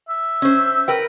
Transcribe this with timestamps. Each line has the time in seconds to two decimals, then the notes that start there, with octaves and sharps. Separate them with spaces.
0.09 E5
0.42 C#4 C5
0.88 A#4 B4 G5